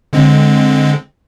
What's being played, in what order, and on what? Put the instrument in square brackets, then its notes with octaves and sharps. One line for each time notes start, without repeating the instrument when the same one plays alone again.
[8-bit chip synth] D3 G#3 C4